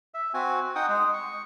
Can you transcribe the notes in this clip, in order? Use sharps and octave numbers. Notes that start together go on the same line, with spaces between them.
E5
C4 F#4 G#5
D#4 F#5 G5 D#6
G#3 G#4
C#6